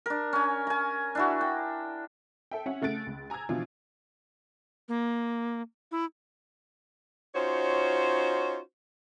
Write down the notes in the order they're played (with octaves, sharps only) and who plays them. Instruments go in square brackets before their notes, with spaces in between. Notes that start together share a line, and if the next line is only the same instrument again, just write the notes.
[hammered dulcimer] D4 A#4
C#4 G#5
G#5 A#5
D4 E4 F#4
G5
[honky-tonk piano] A4 E5 G5
C#4 E5 F#5
C#3 A3 F#6 A6 D7
C#2
G#5 A#5 D#6 E6 G#6
B2 E3 F3 D4 F4
[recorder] A#3
E4
[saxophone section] C#4 D#4 F4 F#4 C5 C#5